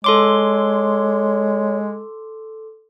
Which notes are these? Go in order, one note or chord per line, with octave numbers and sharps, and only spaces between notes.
G#3 A4 C#5 C6 D6